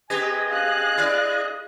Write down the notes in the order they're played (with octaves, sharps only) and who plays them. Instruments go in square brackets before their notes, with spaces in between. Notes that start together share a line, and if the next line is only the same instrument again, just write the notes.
[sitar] C4 G4 B4 [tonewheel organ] G#4 D#5 [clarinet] G#5
[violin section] F5 F#6
[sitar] E4 D5